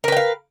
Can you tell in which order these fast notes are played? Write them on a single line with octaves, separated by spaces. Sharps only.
A#4 B4 G5 F5